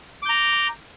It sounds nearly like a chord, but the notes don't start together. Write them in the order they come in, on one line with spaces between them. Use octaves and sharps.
D6 G6 A#5